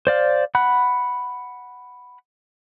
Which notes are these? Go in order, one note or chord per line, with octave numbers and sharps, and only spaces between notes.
C5 D5 F5
F#5 B5 F#6